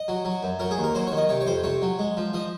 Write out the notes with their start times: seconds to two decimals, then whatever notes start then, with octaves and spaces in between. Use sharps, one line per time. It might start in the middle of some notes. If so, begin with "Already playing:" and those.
Already playing: D#5
0.08 F#3
0.25 F#3
0.43 F#2
0.59 F#3 A#4
0.71 G#4
0.78 D#2
0.84 A#4
0.95 F#3 C5
1.07 C#5
1.12 D#3
1.17 D#5
1.29 C3 C#5
1.41 C#5
1.47 F2 C5
1.64 C3 C#5
1.82 F#3
1.99 G#3
2.17 F3
2.33 F3 D#5